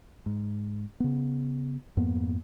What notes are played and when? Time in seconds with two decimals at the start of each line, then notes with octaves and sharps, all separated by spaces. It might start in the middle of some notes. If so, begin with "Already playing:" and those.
0.26 G#2
1.00 C#3 B3
1.97 F2 G#2 A#3 B3